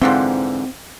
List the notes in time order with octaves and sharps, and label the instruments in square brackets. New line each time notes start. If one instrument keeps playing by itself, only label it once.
[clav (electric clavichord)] G#2 D3 E3 [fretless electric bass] C4 [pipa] F4 F#5 G5